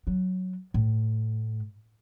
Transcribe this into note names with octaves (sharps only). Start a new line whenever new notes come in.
F#3
A2